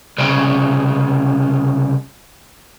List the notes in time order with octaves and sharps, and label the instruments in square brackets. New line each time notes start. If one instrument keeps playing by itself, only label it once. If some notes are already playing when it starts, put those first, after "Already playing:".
[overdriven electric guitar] C2 C#3